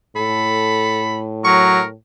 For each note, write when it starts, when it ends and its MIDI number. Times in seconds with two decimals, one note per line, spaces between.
0.16 1.94 45
0.16 1.36 69
0.16 1.21 83
1.45 1.80 54
1.45 1.85 70
1.45 1.83 85